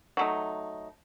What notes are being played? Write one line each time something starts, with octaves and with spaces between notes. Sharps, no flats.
F#3 A3 D#4